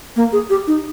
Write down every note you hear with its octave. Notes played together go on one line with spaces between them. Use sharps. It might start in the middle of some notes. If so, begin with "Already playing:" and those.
A#3
G#4
G4
D#4